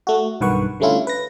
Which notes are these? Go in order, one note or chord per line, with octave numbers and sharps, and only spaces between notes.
A3 F#4
B1 G2 D#3 B4 F#5 C#6
D3 G3 A3 C#4 E4 F4
B4 A#6